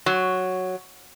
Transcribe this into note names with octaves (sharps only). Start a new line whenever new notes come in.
F#3